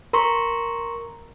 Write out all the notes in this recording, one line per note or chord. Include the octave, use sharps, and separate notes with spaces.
A#4 A#5 C6 C#6